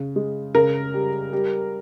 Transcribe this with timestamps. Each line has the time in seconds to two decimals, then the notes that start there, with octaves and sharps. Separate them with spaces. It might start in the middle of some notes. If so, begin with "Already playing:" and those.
Already playing: C#3
0.16 G#3
0.54 C#3 A#4
0.94 G3
1.33 G3